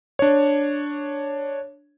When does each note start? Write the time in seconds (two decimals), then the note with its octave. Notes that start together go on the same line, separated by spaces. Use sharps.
0.19 D4 C#5